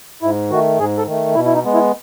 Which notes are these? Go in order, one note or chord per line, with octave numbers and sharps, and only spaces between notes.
G#2 E4
D#3 A3 F#4
G#2 G#4
A4
D#3 A3
B2 E4
E4
D#4
G#3 B3
E4